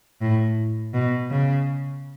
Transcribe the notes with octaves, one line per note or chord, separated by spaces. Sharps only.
A2
B2
C#3